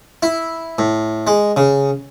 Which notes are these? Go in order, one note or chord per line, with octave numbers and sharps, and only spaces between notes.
E4
A2
G#3
C#3